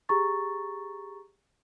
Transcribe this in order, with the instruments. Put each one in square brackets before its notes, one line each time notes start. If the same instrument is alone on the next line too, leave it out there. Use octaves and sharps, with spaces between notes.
[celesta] G4 G#4 A#5 C#6 A6